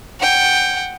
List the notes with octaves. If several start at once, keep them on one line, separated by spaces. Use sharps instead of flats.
F#5 G5